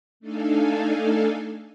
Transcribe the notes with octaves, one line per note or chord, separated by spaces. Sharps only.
A3 D4 D#4 A4 F5 G#5